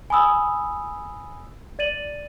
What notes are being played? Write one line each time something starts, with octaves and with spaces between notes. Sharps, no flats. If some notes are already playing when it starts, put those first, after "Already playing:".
G#5 B5 D#6 E6
D5 A6 D#7 F#7